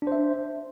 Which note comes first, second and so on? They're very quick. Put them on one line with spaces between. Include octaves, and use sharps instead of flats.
D4 C5 E5